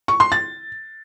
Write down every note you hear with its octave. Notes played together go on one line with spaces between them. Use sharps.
C#6
C6
A6